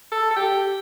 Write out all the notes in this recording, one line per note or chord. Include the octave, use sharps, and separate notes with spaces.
A4
A4
G4